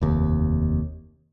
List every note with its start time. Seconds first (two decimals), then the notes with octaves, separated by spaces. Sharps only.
0.01 F1 D#2